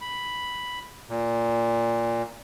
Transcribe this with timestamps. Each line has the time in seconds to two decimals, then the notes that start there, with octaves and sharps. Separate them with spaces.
0.01 B5
1.09 A#2